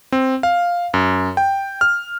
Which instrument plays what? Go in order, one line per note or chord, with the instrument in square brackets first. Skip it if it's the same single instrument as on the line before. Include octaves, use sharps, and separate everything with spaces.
[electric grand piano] C4
F5
F#2
G5
F6